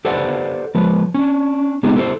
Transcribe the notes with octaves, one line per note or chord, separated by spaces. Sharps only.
G4 A4 B4 C5 D5 F#5
F3 G#3 B4
C#4 D4
G#3 B3 C4 D#4 G4 G#4
E4 G4 A4 A#4 C5